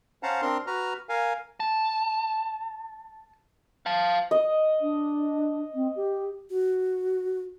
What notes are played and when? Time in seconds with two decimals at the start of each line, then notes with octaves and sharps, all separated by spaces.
0.23 C#4 C5 F5 F#5 A5 A#5
0.42 C4 D4 A#4 C6
0.67 F#4 B4 A#5 F6
1.09 A#4 F5 G#5
1.60 A5
3.86 F5 A5
4.31 D#5
4.81 D4
5.74 C4
5.96 G4
6.50 F#4